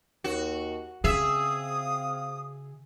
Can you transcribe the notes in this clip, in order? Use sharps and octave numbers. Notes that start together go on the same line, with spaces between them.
D#2 F#4
C#3 C4 G#4 E5 F5 D#6